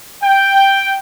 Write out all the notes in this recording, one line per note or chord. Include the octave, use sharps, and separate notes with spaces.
G5